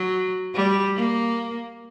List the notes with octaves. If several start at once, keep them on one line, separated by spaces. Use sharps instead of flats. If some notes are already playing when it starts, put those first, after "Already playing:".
Already playing: F#3
G3
A#3